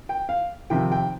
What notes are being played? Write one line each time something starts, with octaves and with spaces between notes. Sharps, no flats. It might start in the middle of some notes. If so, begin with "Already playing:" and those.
G5
F5
F2 C3 D#3 G5
G5